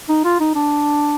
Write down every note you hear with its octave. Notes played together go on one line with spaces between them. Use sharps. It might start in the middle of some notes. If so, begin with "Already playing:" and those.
D#4
F4
D#4
D4